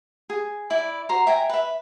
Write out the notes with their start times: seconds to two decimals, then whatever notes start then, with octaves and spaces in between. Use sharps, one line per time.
0.30 G#4
0.70 E4 D5 E5 B5
1.09 F#4 C5 A#5 C6
1.27 E5 G5 G#5 A#5
1.49 B4 E5